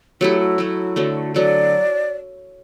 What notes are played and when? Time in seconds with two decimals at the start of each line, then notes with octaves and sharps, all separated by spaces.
0.21 F#3 A3 E4 G4
0.39 F#4
0.58 F#3 A3 E4
0.96 D3 F#3 A3
1.34 D3 F#3 A3 D5